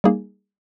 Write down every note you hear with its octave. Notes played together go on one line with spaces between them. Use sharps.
G3 A#3 D#4 G#4